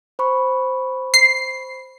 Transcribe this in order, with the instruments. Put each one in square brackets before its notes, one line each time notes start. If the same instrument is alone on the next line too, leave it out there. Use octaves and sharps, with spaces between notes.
[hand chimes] C5 B5 C#6
[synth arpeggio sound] C7